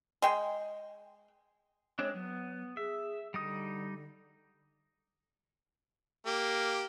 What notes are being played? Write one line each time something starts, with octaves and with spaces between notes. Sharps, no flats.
G#3 G5
G#3 C4 D4 C#5
F#3 B3
G#4 E5
D3 G3 D#4 D#6
A#3 G4